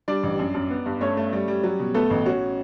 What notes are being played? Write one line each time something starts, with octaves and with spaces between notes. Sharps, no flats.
G3 D4 D5
A1
F#2
F#2
B3
G2
A3 C#4 C#5
A3
G3
G3
F#3
B2
A3 B3 A4
A1
C#4 F#4